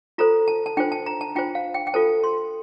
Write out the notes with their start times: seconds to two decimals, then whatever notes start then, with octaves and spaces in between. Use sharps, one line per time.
0.18 F4 A4 C5 A#5
0.48 A5
0.66 A5
0.77 D4 F4 C5 G5
0.92 A5
1.06 A#5
1.21 A5
1.35 D4 F4 C5 G5
1.55 F5
1.74 G5
1.87 G5
1.94 F4 A4 C5 A5
2.24 C6